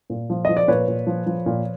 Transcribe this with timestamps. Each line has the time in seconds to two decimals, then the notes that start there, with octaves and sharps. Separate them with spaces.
0.10 A#2
0.30 F3
0.45 F3 D#5
0.57 D5
0.68 A#2 B4 C#5
0.88 A#2
1.07 F3
1.26 F3
1.46 A#2